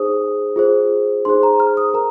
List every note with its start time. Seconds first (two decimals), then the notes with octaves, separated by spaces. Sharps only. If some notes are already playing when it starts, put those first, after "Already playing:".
Already playing: D#4 G#4 C5 D#6
0.56 F4 G#4 C5
1.25 D#4 G#4 C5 C6
1.43 A#5
1.60 F6
1.77 D#6
1.94 A#4 A#5